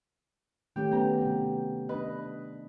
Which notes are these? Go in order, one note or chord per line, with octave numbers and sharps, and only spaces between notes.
D#3 A3 C#4 G4
F#3 B3 G5 A#5
C3 F#3
D4 B4 D#5